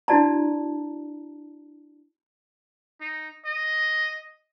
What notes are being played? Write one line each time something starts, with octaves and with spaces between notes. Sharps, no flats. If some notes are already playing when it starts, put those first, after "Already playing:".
D4 E4 F#4 D5 A5 A#5
D#4
D#5